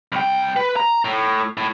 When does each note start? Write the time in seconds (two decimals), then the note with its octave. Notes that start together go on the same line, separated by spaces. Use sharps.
0.12 C2 G5
0.56 B4
0.76 A#5
1.05 A2
1.57 A2